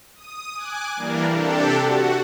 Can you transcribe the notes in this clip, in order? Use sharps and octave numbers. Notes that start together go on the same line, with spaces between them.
D#6
G#5 D6 F#6
E3 G3 A#3 D4 A#4
C3 D4 G4 A4
F#4 F#5